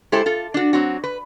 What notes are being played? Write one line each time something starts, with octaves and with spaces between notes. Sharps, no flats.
G#3 E4 G4 A4 C5
F4 A4
D4 F#4
F#3 C4 F#4
B4